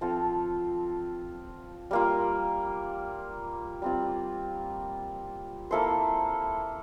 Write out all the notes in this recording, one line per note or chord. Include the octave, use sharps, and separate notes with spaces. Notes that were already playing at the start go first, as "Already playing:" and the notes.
F3 C4 F4 A4
G3 A#3 F4
G3 C4 F4
A#3 E4 A4 C5